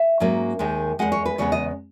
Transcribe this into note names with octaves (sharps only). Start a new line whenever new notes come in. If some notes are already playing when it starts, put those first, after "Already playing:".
Already playing: E5
G#2 F#3 A#3 C#4
D#2 D#3 G#3
E2 C#3 G#3 F#5
C#5
B4
E2 C#3 G#3 B3 C#5
D#5